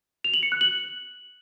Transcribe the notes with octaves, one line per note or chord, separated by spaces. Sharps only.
F7
F#7
C#7
F#6
F#7